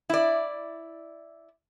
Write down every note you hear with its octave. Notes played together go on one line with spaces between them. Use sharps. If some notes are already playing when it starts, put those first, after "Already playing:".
E4 D5